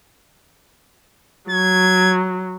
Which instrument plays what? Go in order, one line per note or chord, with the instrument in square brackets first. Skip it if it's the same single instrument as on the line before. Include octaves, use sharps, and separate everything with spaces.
[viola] F#3 [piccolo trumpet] G#6